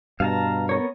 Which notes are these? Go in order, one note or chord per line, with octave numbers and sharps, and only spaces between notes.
G2 B2 F5 A5 A#5
B3 A#4 C#5